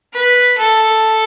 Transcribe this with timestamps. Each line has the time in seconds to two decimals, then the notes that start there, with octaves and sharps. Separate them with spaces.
0.13 B4
0.57 A4